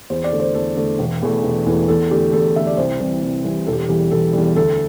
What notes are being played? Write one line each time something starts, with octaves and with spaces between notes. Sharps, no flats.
E2 C5
D5
D3 A3
C5
E2 A4
D3 A3
E1
E2 E3 A3
E1
E2 E3 A3
E2 A4
D3 A3 G4
E2 A4
D3 A3 E5
D5
C2 C5
C3 E3 G3
C2
C3 E3 G3
E1 A4
G4
E2 E3 G3 G4
E1 A4
E2 E3 G3
D2 A4